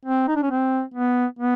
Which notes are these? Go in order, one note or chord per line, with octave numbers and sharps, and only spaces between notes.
C4
D#4
D4
C#4
C4
B3
B3